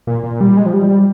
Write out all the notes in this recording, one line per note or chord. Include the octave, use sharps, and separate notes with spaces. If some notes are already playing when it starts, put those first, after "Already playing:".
A#2
A#2
G3
G#3
F3
G3
G3